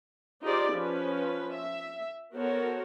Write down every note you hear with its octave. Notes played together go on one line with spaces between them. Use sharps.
D#4 F4 G4 G#4 C5 D5
F3 C#4 B4
E5
B3 F#4 A4 A#4 C5 C#5